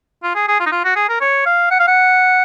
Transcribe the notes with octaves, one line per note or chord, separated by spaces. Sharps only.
F4
G#4
G#4
F4
D#4
F4
F#4
G#4
A#4
C#5
F5
F#5
F5
F#5